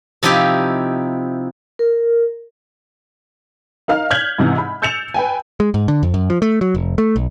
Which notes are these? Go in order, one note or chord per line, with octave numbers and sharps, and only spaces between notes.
C3 F3 D#4 E4 G4 F5
A#4
D#4 A#4 F5 F6
F6 G6 G#6 B6 F7 F#7
G#2 C3 E3
B5
E6 G6 A6 C#7 E7 F7
B4 G5 G#5
G#3
G#2
D3
F2
F#2
F3
A3
F#3
F1
A3
B1